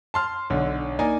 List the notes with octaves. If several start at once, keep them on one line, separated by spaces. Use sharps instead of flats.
A5 C6 F6
B1 D3
A#3 D#4 D5 G#5